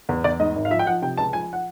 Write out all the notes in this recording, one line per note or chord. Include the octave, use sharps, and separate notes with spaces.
E2
E2 D5
G#2 D#5
G#1
F5
F3 E5
G5
F3 F#5
C3 G5
C#2 A5
F3 G#5
F#5